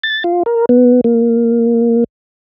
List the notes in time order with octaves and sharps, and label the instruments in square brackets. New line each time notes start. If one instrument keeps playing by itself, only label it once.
[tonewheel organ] A6
F4
A#4
B3
A#3